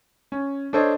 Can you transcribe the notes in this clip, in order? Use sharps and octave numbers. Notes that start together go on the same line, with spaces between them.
C#4
D4 A4 C5 C#5 D#5